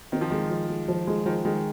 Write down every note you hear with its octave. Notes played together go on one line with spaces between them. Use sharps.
D#3 C4
F3
D#3 G#3
F3
G#3
F3
G#3
D#3 F3
D#3 G#3